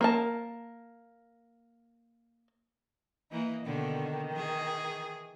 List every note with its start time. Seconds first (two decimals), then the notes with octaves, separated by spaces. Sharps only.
0.01 A#3 A#4 A5
3.32 E3 A#3 D#4
3.66 B2 D3 D#3
4.32 E3 G#4